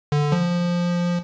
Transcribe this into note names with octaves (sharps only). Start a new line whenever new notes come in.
D3
F3